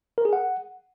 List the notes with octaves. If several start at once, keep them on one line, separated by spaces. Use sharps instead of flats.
A#4
G#4
F#5